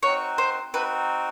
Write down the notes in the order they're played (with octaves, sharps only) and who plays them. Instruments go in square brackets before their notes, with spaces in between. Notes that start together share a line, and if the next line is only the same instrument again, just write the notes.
[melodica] C4 D#4 F#4 [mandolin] C#5
[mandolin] C5
[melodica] C4 D#4 F#4 [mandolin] B4